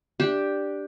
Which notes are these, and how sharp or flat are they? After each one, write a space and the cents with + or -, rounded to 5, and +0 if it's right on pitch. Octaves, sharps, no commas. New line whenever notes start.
D4 +0 G4 +0